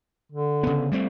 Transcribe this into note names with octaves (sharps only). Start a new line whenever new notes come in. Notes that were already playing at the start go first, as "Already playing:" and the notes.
D3
C#3 B3
G3 A3 C4